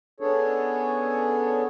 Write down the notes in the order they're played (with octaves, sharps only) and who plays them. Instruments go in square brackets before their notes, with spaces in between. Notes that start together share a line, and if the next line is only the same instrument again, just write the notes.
[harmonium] B3 C#4 D4 G#4 A4 C#5